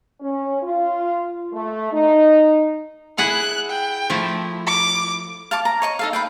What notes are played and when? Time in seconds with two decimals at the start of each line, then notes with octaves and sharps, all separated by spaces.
0.20 C#4
0.63 F4
1.52 A3
1.92 D#4
3.18 E4 G#4 F#5 F#6
3.70 G5
4.10 F3 A3 E4
4.67 D6
5.51 F5 A5 C#6 D6
5.65 A#5
5.82 C#5 D#5 C#6
5.99 D#4 A4 F5
6.13 B4 F5 G5